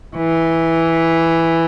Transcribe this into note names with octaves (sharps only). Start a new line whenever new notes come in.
E3